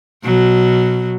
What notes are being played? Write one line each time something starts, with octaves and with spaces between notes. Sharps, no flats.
B2 F#3